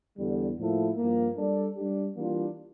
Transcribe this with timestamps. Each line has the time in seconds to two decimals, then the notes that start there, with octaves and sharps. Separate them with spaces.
0.18 E2 D3 G3
0.58 A2 F3 A#3 E4 A4
0.96 G2 F3 A#3
1.36 G3 D4 A4 D5
1.75 G3 D4 G4
2.15 E3 G3 A#3 D4 F4